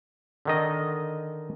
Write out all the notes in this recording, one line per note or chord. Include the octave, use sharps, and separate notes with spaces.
D3 D#3 D#5